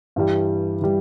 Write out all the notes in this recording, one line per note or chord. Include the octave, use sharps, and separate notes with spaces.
G2 E3 G3
E3 G3